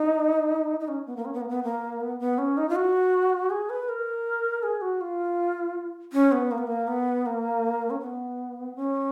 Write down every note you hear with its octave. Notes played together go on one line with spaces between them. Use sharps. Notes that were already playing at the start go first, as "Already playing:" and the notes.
Already playing: D#4
D#4
C#4
B3
A#3
C#4
B3
A#3
B3
A#3
B3
B3
C#4
D#4
F4
F#4
G#4
B4
A#4
G#4
F#4
F4
C#4
B3
A#3
B3
A#3
B3
A#3
C#4
B3
C#4